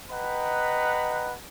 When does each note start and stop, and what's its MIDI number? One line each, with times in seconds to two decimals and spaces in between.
0.11 1.34 71
0.11 1.34 75
0.11 1.34 78
0.11 1.34 79
0.11 1.34 82
0.11 1.34 83